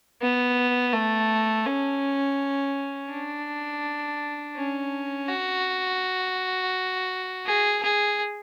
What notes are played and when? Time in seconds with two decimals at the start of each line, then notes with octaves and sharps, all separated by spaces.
0.22 B3
0.93 A3
1.66 C#4
3.11 D4
4.56 C#4
5.29 F#4
7.46 G#4
7.83 G#4